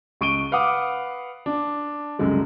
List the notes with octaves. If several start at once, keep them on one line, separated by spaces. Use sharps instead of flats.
C#2 C#6 D7 D#7 G7
B4 F5 F#5 B5 D6 D#6
D4
C2 F#2 C#3 G#3 A3